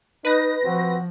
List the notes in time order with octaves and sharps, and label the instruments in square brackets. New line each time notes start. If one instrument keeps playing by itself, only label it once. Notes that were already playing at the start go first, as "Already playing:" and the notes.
[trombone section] D#4 [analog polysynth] B4 A#6
[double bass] F3 [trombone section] C4 F#4